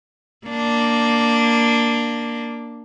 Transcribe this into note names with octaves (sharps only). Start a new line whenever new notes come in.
A#3 D4